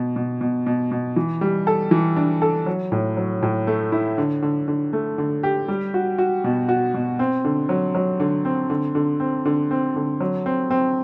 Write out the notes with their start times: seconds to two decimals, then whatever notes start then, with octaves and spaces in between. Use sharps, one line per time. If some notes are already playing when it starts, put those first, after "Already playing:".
Already playing: B2
0.16 B2
0.41 B2
0.66 B2
0.91 B2
1.16 E3
1.41 G3
1.67 A4
1.91 E3
2.16 D4
2.42 A4
2.66 F#3
2.92 A2
3.17 F#3
3.42 A2
3.67 A3
3.92 E4
4.18 D3
4.42 D3
4.68 D3
4.93 A3
5.18 D3
5.43 G4
5.68 G3
5.94 F#4
6.18 F#4
6.44 B2
6.69 F#4
6.94 B2
7.19 C4
7.45 D3
7.69 F#3
7.95 F#3
8.20 D3
8.45 C4
8.70 D3
8.95 D3
9.20 C4
9.45 D3
9.71 C4
9.96 D3
10.21 F#3
10.46 C4
10.71 C4